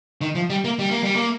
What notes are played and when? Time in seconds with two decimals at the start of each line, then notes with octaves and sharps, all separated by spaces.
0.21 D#3
0.35 F3
0.50 G3
0.64 A#3
0.79 G3
0.91 A#3
1.03 G3
1.16 A#3